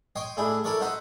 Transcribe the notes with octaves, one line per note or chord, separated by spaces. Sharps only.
C#5 D#5 G5 C6
A2 D4 E4 G#4
E4 A4 A#4 C#5 D5 C#6
D#4 F#4 C5 E5 F#5